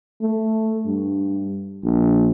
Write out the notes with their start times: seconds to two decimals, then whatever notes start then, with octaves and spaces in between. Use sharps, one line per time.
0.22 A3
0.86 G2
1.84 A#1